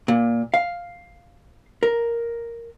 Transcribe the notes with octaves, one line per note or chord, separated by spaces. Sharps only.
A#2
F5
A#4